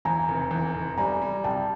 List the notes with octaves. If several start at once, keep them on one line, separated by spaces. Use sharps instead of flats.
E2 G#5 A#5
F1
E2
F1
G3 G#5 A#5
G3
C2 G5 A5